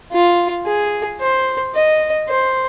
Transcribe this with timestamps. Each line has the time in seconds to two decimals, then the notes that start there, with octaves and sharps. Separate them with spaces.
0.12 F4
0.66 G#4
1.20 C5
1.74 D#5
2.29 C5